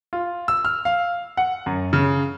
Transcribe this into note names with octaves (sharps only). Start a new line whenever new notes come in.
F4
E6
F6
F5
F#5
F#2
C#3